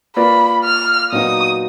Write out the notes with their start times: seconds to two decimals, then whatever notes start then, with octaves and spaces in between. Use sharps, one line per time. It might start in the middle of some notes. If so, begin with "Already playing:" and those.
0.17 A#3 F4 B4 D5 B5
0.64 F6
1.12 A#2 F#3 B3 D#4 F#4 D#6